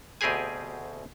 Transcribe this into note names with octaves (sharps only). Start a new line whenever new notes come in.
D2 B2 C4 G4 G#4 G#5